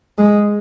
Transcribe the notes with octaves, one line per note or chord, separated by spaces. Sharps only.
G#3